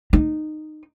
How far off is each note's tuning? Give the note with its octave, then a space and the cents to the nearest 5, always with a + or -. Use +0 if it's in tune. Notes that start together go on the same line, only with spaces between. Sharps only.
D#4 -15